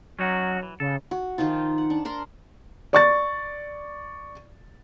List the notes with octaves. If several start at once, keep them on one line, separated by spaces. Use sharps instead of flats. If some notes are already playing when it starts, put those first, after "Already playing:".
F#3 C#4 D#4 F#4
E3
C#3 A4
F#4
D#3 F3 D#4 F4
F#5
D4
D4 A#4 C6
D5 C#6 A6